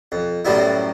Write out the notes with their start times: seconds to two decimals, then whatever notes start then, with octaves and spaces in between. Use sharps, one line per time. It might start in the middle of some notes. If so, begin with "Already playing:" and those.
0.12 F2
0.45 F#2 A2 F#3 G3 B3 E4